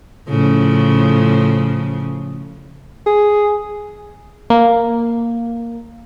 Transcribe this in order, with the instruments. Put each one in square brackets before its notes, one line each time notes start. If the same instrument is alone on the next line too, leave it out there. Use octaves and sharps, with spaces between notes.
[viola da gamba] A2 C#3 F3
[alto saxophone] G#4
[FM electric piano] A#3